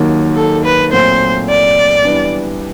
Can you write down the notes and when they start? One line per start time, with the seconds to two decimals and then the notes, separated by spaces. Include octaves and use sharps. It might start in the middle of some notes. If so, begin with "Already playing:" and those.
Already playing: D#2 D#3 F#3 A#3
0.36 A4
0.64 B4
0.92 A#2 F#3 A3 C4 C5
1.49 D5
2.05 E3 G3 B3 D4